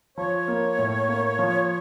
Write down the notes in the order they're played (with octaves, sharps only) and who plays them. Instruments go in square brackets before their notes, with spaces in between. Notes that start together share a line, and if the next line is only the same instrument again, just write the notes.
[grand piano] F3 [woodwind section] C#5
[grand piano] A#3
A2
A#3
F3